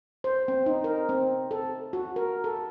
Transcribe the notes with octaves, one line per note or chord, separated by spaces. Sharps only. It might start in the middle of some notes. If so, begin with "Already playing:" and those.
C5
C4
D#4
A#4
C4
A4
F#4
A#4
A4